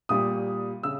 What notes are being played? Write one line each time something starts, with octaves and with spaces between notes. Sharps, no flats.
A#2 G3 D#6
C#3 E6